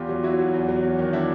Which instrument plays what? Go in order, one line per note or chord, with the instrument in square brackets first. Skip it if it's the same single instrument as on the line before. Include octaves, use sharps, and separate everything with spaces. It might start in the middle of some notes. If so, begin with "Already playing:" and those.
Already playing: [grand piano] E2 F4 G4
F#3
F#3 E4 F#4
F#3
E2
F#3
E2
D#3
D4 E4